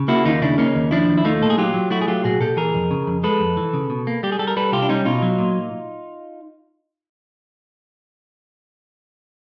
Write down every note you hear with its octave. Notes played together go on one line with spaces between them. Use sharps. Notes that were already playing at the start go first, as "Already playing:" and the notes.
Already playing: C#3
A#3 E4 F#4
D#2 D#4 F4
C#3 D4 E4
A#3 C#4 D#4
D#2
F3 D4 E4
D#2
E4
A3 D#4 F4
A#2 A4
G#4
F#3 F4 G4
F#3
A3 E4 F#4
G#4
F#3 F4 G4
A#2 F#4 G#4
A#2 G4 A4
E3 G#4 A#4
F2
C#3
F2
G#3 A4 B4
F2
E3
C#3
B2
A#3
G3 G4
G#4
G3 A4
A#4
G3 A4 B4
C2 F4 G4
D4
G3 C#4 D#4
B2 D#4 F4
F#3
A#2